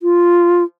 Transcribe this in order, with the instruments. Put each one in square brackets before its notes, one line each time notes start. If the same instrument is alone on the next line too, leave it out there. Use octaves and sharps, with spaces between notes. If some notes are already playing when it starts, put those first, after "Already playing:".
[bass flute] F4